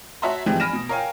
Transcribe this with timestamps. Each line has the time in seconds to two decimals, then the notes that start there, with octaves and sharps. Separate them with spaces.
0.22 F#4 C#5 E5 A5 A#5 C6
0.46 E3 F3 G#3 C4 G4
0.60 G#5 B5 F6 A#6 D7 E7
0.73 B2
0.89 A#4 C#5 F5 G5 G#5